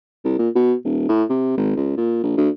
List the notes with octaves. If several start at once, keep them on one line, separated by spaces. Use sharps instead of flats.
C2
A#2
B2
D#1
A2
C3
G#1
C#2
A#2
A#1
D2